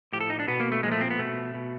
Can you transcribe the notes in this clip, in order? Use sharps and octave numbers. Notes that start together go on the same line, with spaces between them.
A2 F3 G4
A4
D#4
D4
B2 B3
A#3
A3
A#2 F3 G#3
A3
C4
B3
B2 A3
B2